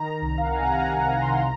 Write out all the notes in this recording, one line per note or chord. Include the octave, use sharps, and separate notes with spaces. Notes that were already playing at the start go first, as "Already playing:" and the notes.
Already playing: D#3 A#5
C2
F5
F#5
G#5
C3 A#5
F#5
C2 A#5
C6
A#5